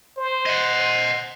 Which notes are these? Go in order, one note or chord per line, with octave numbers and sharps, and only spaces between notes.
C5
D#5 F#5
C5